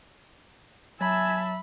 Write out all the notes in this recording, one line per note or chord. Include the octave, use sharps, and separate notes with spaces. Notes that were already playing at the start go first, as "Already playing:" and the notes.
F#3 E5 G#5 A5 B5